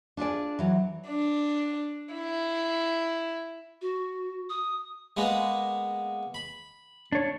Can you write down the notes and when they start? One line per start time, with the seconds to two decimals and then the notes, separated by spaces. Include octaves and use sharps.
0.17 D4 F4 G#4 D5
0.59 E3 F#3
1.09 D4
2.14 E4
3.81 F#4
4.50 D#6
5.17 G#3 A#3 B3
6.34 B5
7.12 D4 C#5